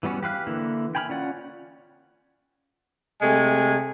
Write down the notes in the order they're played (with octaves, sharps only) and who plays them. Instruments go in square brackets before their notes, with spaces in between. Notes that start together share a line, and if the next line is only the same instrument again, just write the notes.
[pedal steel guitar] E3 G3 B3 C#4 F#4
G4 B4 F5 F#6
D3 E3 A#3 E4
G5 G#5 B5 C#6 F6
C#4 F4 D5 F#5
[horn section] C3 G#3 A3 G#5